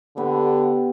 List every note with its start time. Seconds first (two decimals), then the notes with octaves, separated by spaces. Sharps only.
0.17 D3 B3 G4